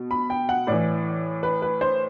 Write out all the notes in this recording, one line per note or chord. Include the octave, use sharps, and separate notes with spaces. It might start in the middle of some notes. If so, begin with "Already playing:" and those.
Already playing: B2
B5
G5
F#5
A2 E3 D5
B4
B4
C5